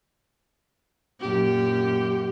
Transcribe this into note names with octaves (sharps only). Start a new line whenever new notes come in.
F#2 A#2 G4